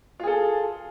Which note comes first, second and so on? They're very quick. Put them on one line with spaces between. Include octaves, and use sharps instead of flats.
F4 G#4 A4